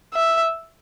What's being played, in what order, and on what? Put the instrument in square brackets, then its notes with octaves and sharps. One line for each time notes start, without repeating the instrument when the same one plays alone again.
[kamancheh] E5